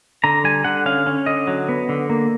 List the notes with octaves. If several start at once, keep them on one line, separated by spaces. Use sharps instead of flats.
D3 A#5
G3 G#5
D3 F#5
C#4 F5
C#4
D3 D#5
F#3
B3
D3
A#3